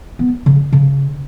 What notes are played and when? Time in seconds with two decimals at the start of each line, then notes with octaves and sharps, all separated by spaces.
0.19 B3
0.46 C#3
0.72 C#3